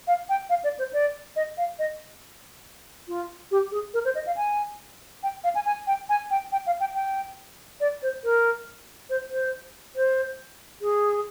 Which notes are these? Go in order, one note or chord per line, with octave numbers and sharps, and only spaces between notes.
F5
G5
F5
D5
C5
D5
D#5
F5
D#5
F4
G4
G#4
A#4
C5
D#5
F5
G#5
G5
F5
G#5
G#5
G5
G#5
G5
G5
F5
G5
G5
D5
C5
A#4
C5
C5
C5
G#4